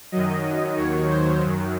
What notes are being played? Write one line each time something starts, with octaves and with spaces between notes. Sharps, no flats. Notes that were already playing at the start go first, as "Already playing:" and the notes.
F#2 D#3 F#3 D#5
D#2 D#3 F#3 C#5
C5
F#2 D#3 F#3